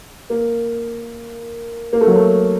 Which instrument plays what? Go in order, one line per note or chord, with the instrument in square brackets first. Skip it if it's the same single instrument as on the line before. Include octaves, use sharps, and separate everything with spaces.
[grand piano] A#3
A#3
A3
F#3
A3